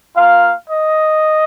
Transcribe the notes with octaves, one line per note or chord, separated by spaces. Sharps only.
A#3 F4 F5
D#5